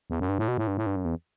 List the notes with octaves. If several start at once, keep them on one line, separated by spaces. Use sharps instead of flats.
E2
F#2
G2
A2
B2
A2
G2
A2
G2
F#2
E2